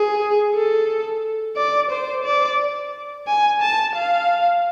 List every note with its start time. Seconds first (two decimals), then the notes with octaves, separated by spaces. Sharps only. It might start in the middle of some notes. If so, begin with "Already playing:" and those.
Already playing: G#4
0.54 A4
1.57 D5
1.91 C5
2.25 D5
3.27 G#5
3.61 A5
3.96 F5